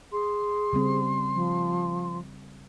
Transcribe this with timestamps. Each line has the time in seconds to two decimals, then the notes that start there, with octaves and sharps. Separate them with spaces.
0.12 G#4 C6
0.73 C#3 G3 C4
1.34 F3